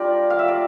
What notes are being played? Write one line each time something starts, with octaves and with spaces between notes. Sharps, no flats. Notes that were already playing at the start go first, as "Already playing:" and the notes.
Already playing: G3 D4 F4 G4 A#4 D5
F5
E5
D5